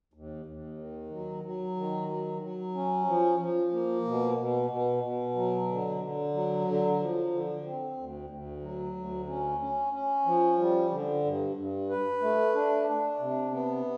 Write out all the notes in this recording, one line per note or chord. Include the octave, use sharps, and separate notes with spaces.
D#2
D#2
D#3
F#3
F#3
D#3
F#3
F#3
C#4
F3
F3
A#3
B2
B2
B2
B2
F#3
D3
D3
F#3
D3
F3
D3
C4
D2
D2
F#3
D2
C#4
C#4
C#4
F3
G3
D3
G2
G2
B4
A3
D4
D4
C3
B3